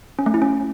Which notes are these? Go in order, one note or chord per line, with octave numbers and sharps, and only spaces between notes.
C#4
A3
E4
C#4